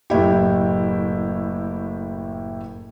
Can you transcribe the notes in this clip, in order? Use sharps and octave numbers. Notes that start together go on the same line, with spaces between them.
F#1 A2 E4 G4